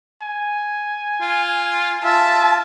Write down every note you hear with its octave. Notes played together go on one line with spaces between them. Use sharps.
G#5
F4
F4 E5 A5